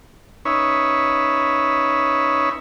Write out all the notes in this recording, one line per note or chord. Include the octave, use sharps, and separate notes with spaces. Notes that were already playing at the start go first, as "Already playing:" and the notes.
C#4 D#4 B4 C#5 E5